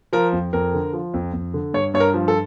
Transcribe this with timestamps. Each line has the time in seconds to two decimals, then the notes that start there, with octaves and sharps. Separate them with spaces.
0.13 F3 A#4
0.32 F2
0.53 F2 A#4
0.74 D3
0.93 F3
1.14 F2
1.33 F2
1.54 D3
1.73 G2 C#5
1.94 G2 C#5
2.00 A#4
2.14 F3
2.28 A4